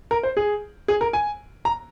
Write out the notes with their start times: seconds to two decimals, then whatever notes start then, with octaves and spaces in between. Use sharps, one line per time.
0.11 A#4
0.23 C5
0.37 G#4
0.88 G#4
1.01 A#4
1.13 G#5
1.65 A#5